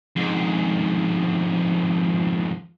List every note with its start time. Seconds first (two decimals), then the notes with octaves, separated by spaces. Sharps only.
0.17 F2 G#2